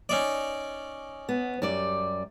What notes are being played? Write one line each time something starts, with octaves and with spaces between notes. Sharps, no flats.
C#4 D#4 D5
B3
F#2 G3 D5